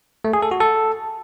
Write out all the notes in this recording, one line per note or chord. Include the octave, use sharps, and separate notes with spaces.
A3
G#4
A4
F#4
A4